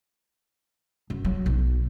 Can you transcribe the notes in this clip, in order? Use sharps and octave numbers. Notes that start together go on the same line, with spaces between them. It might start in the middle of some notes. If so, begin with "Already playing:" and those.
F#2
F#3
B1